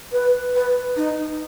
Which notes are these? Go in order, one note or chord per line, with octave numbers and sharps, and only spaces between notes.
B4
B4
D#4